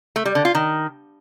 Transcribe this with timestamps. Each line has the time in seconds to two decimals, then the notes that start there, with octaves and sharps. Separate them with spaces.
0.16 A3
0.25 G3
0.35 D3
0.45 F4
0.55 D#3